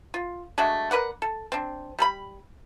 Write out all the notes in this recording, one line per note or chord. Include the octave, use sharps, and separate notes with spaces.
F4
G#3 A3 D4 F#4
A#4 B4 D5 F#5
A4
C4 D4
G3 A4 B5